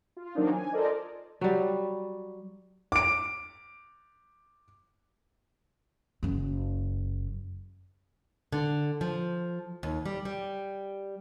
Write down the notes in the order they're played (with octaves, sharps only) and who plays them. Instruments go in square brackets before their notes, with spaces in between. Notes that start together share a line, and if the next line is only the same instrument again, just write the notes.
[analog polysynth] F4
D#3 F#3 A#3 C4 D4 D#4
G#5
F4 A4 A#4 C5 D5 D#5
[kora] F#3 G3
[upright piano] D6 D7
[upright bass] F#1 F#2
[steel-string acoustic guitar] D3
F3
D#2
G3
G3